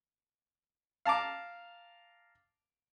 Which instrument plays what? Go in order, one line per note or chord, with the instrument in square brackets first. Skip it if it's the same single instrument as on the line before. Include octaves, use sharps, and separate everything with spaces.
[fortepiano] F5 A5 A#5 D6